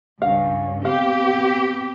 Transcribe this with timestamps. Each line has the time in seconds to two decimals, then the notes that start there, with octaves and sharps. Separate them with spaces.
0.22 C#2 G2 C#4 F5
0.85 B3 C4 G4 F5